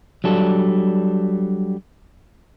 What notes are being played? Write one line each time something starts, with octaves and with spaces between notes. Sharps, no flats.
F#3 G3 D4 A4